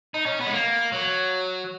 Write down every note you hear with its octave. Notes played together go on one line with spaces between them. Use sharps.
D#4
C#4
B3
G#3
A#3
F#3